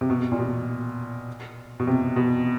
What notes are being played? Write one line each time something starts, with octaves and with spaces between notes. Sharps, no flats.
C3
B2
A#2
B2
B2
C3
B2